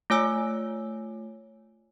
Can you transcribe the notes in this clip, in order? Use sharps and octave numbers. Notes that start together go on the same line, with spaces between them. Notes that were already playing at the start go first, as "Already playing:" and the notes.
A3 F4 C#5 G#5 E6